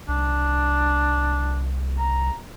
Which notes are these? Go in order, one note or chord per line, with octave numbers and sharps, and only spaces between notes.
C2 D4
A#5